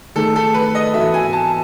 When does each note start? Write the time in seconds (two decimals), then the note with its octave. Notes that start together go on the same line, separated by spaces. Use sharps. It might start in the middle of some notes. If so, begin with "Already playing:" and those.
0.15 D#3 A3 D#4 G#4 A4
0.36 A4
0.54 B4
0.75 D#5
0.94 G#2 E3 B3 F#4 A4 E5
1.14 G#5
1.33 A5